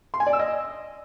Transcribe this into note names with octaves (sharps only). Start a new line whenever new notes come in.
C6
G#5
D5
E6
D#5